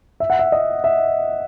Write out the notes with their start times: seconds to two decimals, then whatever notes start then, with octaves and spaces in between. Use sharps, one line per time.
0.20 E5
0.30 F#5
0.39 E5
0.52 D#5
0.84 E5